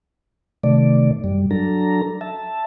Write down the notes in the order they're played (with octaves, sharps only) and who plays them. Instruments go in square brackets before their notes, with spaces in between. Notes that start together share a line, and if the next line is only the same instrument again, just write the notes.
[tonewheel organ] C3 D#3 A3 D5
F#2 G3
F#3 D4 A4 A#5
E5 A5